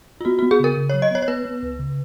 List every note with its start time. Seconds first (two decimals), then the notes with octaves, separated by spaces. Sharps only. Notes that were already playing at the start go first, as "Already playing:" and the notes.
0.21 F4
0.25 B3 F#4
0.39 B3 F#4
0.51 G#4
0.60 C#3 A#4
0.77 C#3
0.90 F#3 C#5
1.02 D#5
1.11 B3 C#5
1.22 C#5
1.28 B3 B4
1.45 B3
1.63 C#2
1.79 C#3